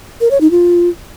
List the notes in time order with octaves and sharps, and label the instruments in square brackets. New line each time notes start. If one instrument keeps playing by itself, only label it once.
[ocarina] A#4
C#5
D#4
F4